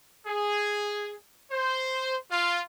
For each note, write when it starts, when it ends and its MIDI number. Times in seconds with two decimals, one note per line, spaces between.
0.26 1.14 68
1.51 2.15 72
2.31 2.60 65